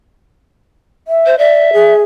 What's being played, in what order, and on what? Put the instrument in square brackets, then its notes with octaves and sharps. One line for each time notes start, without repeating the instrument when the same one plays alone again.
[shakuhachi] E5
[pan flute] C5
[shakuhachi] D5 [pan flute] E5
[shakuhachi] G#4